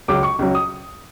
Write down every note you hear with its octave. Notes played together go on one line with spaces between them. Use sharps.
C#2 C#3 F#3 D6
C#6
C#2 C#3 F#3
D#6